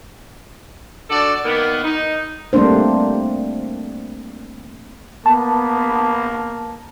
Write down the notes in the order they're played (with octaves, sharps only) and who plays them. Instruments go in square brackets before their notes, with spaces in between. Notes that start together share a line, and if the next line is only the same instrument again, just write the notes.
[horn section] D4 F#4 A4 D5
D#3 A#3 B3
D#4
[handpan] G3 A3 A#3 C4 D4 C5
[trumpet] A#3 [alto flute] B3 [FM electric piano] A5